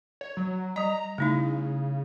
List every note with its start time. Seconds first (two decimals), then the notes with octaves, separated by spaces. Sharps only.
0.21 C#5
0.37 F#3
0.76 G3 D#5 A#5
1.18 C#3 A3 D#4 E4